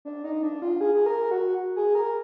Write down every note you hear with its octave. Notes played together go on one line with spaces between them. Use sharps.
D4
D#4
D4
F4
G#4
G#4
A#4
F#4
G#4
A#4